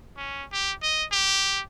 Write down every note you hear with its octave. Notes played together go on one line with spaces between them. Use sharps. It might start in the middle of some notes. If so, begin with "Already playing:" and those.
C#4
G4
D#5
G4